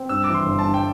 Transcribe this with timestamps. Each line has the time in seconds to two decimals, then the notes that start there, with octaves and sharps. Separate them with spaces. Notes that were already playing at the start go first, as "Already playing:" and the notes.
Already playing: C4
0.09 G2 E6
0.24 E3 D6
0.34 C6
0.46 G1
0.59 A5
0.65 G2
0.74 G5